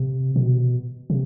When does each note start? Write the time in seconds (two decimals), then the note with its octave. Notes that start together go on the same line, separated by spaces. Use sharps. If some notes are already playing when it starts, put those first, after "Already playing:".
Already playing: C3
0.36 B2
1.10 C3